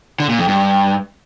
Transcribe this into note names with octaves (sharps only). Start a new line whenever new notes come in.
D3
A#2
F2
G2